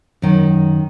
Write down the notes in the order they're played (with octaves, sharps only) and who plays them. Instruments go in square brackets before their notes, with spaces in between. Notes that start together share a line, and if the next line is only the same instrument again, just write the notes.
[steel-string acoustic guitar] F#2 D#3